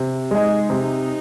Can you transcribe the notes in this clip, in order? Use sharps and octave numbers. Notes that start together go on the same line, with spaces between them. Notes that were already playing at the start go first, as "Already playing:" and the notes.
Already playing: C3
G#3 D#4 G#4
C3 D#4